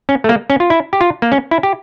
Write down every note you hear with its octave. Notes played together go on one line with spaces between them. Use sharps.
C#4
A3
A#3
C#4
F4
E4
G4
F4
A#3
C#4
E4
G4